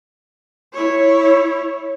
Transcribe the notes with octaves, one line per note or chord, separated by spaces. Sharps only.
E4 C#5